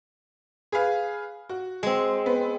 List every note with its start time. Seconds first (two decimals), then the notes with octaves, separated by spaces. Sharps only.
0.72 G#4 B4 F5
1.49 F#4
1.83 G#3 C4
2.26 B3